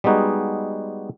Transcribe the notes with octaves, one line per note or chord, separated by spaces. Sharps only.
G3 G#3 B3 D#4 F#4 G#4